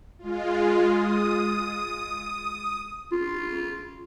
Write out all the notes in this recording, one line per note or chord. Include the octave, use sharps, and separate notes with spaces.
G#3 F4
D#6
F4